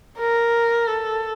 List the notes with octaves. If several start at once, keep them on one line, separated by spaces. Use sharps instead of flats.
A#4
A4